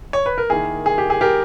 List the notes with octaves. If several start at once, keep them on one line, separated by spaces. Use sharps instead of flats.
C#5
B4
A#4
D#3 A#3 E4 G#4
G#4
G4
G#4
G4 A#4